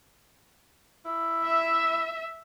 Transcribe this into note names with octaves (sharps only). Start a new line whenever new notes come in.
E4
E5